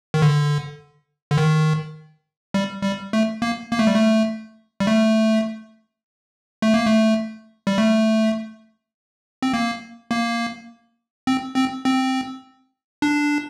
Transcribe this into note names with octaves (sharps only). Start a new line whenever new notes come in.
D#3
D3
D3
D#3
G3
G3
A3
A#3
A#3
A3
G3
A3
G3
A3
A3
A#3
A3
G3
A3
C4
A#3
A#3
C4
C4
C4
D4